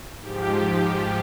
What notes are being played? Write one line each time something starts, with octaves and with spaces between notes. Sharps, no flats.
G#2 F3 G4